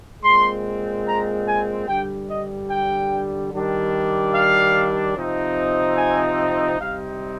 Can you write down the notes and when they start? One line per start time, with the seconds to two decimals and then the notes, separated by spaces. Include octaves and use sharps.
0.23 A#2 G#3 C4 C6
1.06 A#5
1.46 G#5
1.88 G2 D3 G3 G5
2.29 D#5
2.70 G5
3.52 D#3 G3 D4
4.34 F5
5.16 C3 F3 C4 D#4
5.98 G#5
6.80 C3 G3 C4 D#4 F5